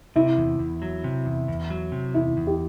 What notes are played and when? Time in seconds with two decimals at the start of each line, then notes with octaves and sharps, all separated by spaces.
0.16 C3 E4
0.38 E2
0.59 E2
0.82 F#3
1.04 C3
1.26 E2
1.48 E2
1.70 F#3
1.92 C3
2.14 E2 E4
2.37 E2
2.47 G4